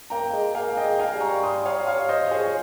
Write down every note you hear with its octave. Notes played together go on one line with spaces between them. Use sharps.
A#3 G5 A#5
G#3
A#3 F5 G#5
D#5 G5
G#3
F5 G#5
G3
A#5 C#6
C6 D#6
C#5 F5
C#5 F5
C5 D#5
C#5
F3 G#4 C5